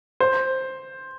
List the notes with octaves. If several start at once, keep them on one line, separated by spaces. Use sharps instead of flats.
C5